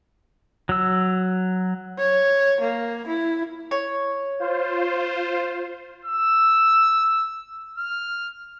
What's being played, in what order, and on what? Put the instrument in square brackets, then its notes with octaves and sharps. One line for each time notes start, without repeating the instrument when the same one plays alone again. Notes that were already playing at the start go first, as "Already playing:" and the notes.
[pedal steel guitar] F#3 E6
[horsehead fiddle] C#5
A#3
E4
[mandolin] C#5
[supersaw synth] F4 C5
[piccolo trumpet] E6
F6